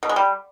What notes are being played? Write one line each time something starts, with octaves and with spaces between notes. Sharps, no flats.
B2
G#3
G3